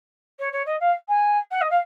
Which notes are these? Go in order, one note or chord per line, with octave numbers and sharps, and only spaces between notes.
C#5
C#5
D#5
F5
G#5
F#5
D#5
F5